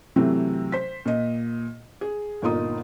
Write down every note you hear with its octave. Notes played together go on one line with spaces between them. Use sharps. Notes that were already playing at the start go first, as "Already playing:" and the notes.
C3 E3 F#3 A3 C4
C5 B6
A#2 D#5
G#4
G1 A#2 A#3 D#4 F4 D#6